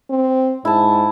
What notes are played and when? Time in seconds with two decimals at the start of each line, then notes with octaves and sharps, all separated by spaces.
0.10 C4
0.65 G#2 E4 A5